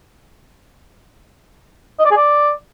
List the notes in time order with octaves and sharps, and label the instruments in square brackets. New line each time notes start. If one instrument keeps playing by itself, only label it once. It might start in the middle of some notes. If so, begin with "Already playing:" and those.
[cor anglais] D#5
D5
G#4
D5